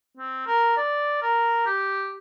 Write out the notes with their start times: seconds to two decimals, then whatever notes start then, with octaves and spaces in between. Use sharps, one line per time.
0.17 C4
0.47 A#4
0.77 D5
1.22 A#4
1.66 G4